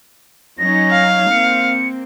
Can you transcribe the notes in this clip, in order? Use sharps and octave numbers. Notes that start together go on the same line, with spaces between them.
F#3 C#4 D#4 A#6
F5
A#3 C4 C#7